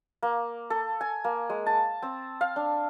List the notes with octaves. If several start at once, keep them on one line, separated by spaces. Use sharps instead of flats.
A#3
A4
G#5
A#3
G#3
A5
C4
F5
D4